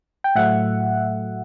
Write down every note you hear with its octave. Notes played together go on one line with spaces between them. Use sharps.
G5
A2 F#3 A3 E5 F#5